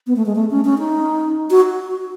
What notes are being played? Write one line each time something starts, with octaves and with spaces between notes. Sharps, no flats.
B3
A3
G#3
A3
C#4
C#4
D#4
F#4